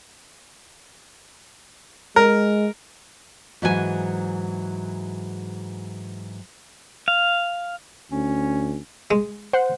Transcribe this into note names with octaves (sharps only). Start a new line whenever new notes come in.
G#3 A#4
G#2 E3 F#3 A#4 G#5
F5
D2 C#4
G#3
C5 F#5